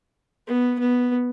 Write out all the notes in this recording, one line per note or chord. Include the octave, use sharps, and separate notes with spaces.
B3
B3